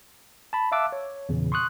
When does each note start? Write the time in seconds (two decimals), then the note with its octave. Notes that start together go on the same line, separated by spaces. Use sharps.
0.53 A5 B5
0.72 E5 F5 A5 D6 E6 F#6
0.92 C#5
1.29 E2 A#2 C#3
1.52 C6 C#6 D#6 F#6